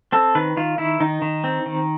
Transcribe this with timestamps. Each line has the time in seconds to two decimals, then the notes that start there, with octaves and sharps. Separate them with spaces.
0.12 C4 A4
0.35 D#3 B4
0.57 D#3 F4
0.78 D#3 E4
1.00 D#3 D#4
1.22 D#3
1.44 C4
1.66 D#3